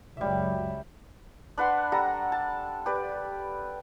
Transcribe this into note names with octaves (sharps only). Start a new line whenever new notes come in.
C#2 F#2 F#3 G3 E5
D4 B4 F#5 C6
G3 A4 F#5 A#5
A5
G4 B4 D5